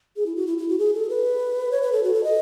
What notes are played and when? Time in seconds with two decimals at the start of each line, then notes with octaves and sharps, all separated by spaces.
0.16 G#4
0.26 E4
0.36 F#4
0.47 E4
0.58 E4
0.68 F#4
0.79 G#4
0.94 A4
1.09 B4
1.72 C#5
1.82 B4
1.92 A4
2.03 F#4
2.14 A4
2.24 D#5